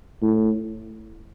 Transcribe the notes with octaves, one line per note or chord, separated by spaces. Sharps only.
A2